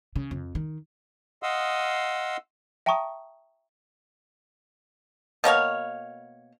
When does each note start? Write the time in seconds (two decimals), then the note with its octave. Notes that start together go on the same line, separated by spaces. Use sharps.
0.16 C#3
0.31 F2
0.55 D#3
1.43 D#5 F5 F#5 C6 D#6 E6
2.86 E5 G5 A5 A#5 C#6 D#6
5.44 B2 A#3 C#5 F5